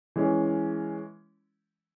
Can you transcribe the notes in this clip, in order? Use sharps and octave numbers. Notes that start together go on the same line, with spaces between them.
E3 G#3 C#4